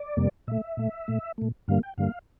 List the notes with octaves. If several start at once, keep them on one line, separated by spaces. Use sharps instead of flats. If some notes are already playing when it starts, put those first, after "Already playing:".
Already playing: D5
F2 C3 G3 A#3
A#2 A3 E5
A#2 A3
A#2 A3
A#2 A3
G2 D3 G3 A#3 F5
G5
G2 D3 G3 A#3 F5